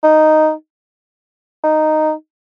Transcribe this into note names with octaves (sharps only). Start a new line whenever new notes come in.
D#4
D#4